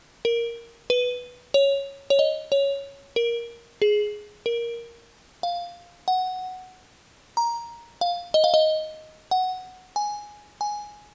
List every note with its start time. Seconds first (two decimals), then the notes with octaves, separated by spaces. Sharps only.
0.25 A#4
0.90 B4
1.54 C#5
2.10 C#5
2.19 D#5
2.52 C#5
3.16 A#4
3.82 G#4
4.46 A#4
5.43 F5
6.08 F#5
7.37 A#5
8.01 F5
8.34 D#5
8.44 F5
8.54 D#5
9.31 F#5
9.96 G#5
10.61 G#5